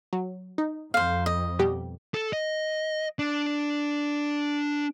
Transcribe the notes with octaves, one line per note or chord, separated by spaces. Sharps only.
F#3
D#4
F2 C5 F5
D#5
B2 G3 G4
A4
D#5
D4